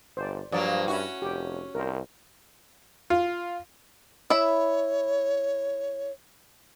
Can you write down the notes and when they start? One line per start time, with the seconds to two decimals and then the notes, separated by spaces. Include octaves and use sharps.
0.17 G1 C5 D5
0.52 G2 F3 F#3 A#3 D5
0.88 C#4 E4 F#4
1.22 F1 G4
1.75 C2 A#4 C5
3.10 F4
4.30 E4 C#5 E5